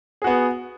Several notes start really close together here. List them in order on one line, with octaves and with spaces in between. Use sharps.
G#4 F#4 B3